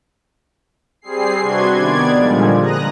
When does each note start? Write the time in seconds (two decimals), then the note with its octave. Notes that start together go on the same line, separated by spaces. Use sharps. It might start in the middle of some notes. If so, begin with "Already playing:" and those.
1.02 G3 C4 G#4 C7
1.42 C3 D4 F#4 B4 C6 G#6
1.76 D#3 B3 D5 G#6
2.13 A#2 D3 F3 G3 G#3
2.60 A#5 D#6 F#6 A#6